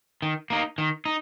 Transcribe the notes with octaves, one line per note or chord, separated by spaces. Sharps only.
D#3
A#3 D#4
D#3
D#4